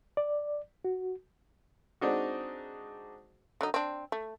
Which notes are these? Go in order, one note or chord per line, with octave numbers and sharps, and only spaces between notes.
D5
F#4
G#3 C4 D4 D#4 F#4
D3 F#3 D#4
C4 D4
A3